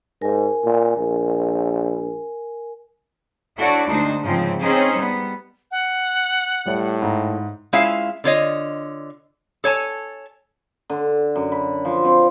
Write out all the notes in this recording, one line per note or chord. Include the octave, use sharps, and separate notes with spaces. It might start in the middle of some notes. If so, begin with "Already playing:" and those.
G#2 A#4 G#5
A#2
A#1
D4 E4 F#4 A4 C#5 D5
D2 G#3 D4 D#4 C5
G#2 C#3 F3 C4
C4 C#4 D#4 G#4 C5
G3 B3
F#5
A2 G3 D5
G#2 A#5
G#3 C#4 E4 F4 E5 F5
D3 F4 C#5 D#5
A4 C#5 G#5 A5
D3
F#2
B5
F3
C4